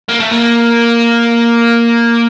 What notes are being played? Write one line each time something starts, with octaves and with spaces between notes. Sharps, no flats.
A#3
A3
A#3